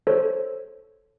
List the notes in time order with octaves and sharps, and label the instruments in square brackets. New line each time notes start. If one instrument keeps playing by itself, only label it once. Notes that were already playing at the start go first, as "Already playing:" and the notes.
[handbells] A4 C5 C#5